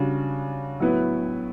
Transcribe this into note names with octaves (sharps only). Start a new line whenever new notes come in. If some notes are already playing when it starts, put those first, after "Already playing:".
Already playing: C#3 G3 D4 F#4
A2 F#3 B3 E4 B4